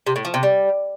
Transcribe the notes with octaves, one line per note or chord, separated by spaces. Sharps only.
C3
A2
F3
C3
G3